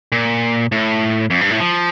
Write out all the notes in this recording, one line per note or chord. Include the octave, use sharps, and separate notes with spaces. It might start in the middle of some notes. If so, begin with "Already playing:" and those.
A#2
A2
F2
G2
A2
F3